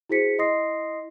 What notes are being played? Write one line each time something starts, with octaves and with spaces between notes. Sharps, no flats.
E4 F#4 G#4 C5 B6 C#7
E4 D#5 C6 D#6 A#6 C7